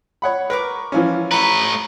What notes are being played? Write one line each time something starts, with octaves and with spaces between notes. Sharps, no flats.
C#5 F#5 B5
A#4 B4 C#6 D6
E3 F3 C#4
A3 B4 A#5 B5